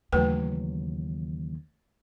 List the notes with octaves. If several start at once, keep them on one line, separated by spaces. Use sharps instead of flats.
D#2 C#3 E3 F#3 A3 B4 G5